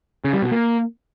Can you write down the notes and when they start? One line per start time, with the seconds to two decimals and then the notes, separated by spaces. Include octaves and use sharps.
0.24 C#3
0.33 G3
0.42 B2
0.51 A#3